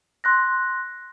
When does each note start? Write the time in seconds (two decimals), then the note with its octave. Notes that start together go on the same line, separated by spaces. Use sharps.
0.24 C6 F#6 A#6